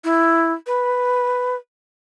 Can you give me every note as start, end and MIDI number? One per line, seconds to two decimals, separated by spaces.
0.04 0.52 64
0.67 1.56 71